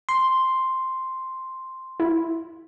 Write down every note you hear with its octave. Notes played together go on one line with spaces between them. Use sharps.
C6
E4